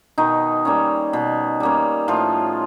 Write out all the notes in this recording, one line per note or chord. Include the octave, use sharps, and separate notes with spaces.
B2 D#3 D#4
G3 A#3 C#4
B2
G3 A#3 C#4
A2 F3 F4